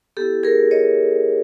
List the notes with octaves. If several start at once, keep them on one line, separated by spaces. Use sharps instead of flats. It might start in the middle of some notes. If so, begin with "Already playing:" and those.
B3 E4 G4 A4
G#4 A#4
C#5 D#5